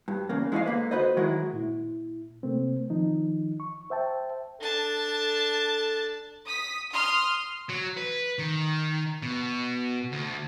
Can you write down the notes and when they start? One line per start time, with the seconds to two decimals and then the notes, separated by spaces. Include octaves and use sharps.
0.08 G2
0.29 E2 C#3 A#3
0.52 G#3 E4 G#4 C#5 D#5 F5
0.66 D3 A#3 B4
0.91 F#4 A4 B4 C5 D#5
1.17 D#3 F#3 G#3 E4 F#4 A#4
1.53 A#2 E4
2.43 C3 A3 A#3 C4
2.90 D#3 F3 D#4
3.60 C#6
3.90 C5 E5 G5 A5
4.61 D4 A4 A5
6.45 D#6 B6
6.92 C6 D#6 F6
7.70 F#3
7.98 B4
8.39 D#3
9.23 B2
10.12 D2